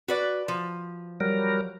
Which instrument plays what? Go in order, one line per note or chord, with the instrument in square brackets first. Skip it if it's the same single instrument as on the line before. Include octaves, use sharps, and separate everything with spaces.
[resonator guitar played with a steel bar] F#4 B4 D5
F3
[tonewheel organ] F#3 G3 A#4